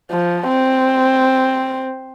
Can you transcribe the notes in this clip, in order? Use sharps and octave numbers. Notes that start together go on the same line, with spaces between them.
F3
C4